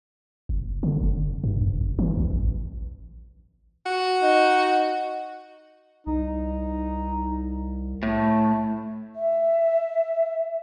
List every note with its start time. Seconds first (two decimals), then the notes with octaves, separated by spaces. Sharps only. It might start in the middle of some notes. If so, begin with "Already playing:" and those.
0.49 F#1
0.83 D3
1.01 F#1
1.44 G2
1.62 F1
1.81 F#1
1.99 E3
2.17 B1
2.31 A1
3.86 F#4
4.23 D#4
6.07 C2 D#4
8.03 A2 A3
9.15 E5